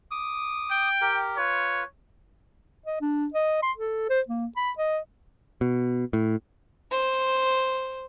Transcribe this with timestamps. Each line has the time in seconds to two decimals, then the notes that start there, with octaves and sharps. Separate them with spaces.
0.11 D6 D#6
0.71 G5
1.01 G4 A#4
1.38 F4 B4 C#5
2.86 D#5
3.01 D4
3.34 D#5
3.63 C6
3.77 A4
4.09 C5
4.28 A#3
4.56 B5
4.78 D#5
5.61 B2
6.13 A2
6.92 C5